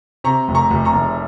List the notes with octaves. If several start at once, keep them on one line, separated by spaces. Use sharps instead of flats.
C3 A#5 C#6
F1
A#5 C#6
F1
A#5 C#6
F1